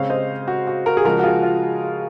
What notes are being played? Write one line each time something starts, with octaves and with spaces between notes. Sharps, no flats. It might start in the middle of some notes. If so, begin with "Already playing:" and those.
Already playing: C#3 G#3 C4 C#5 F5
C5 D#5
F#4
F#4
F#4 A#4
G#4
C#3 F3 G#3 F#4 A#4
F#4
F4 G#4
F4